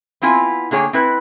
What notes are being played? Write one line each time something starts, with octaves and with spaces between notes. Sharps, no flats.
B3 C4 E4 F4 G#5
D3 A#3 G#4 C#5 G5
C4 E4 B4